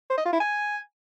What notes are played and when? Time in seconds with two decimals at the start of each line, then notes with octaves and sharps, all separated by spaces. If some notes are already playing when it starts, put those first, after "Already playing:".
0.10 C5
0.18 D#5
0.25 F4
0.33 E4
0.40 G#5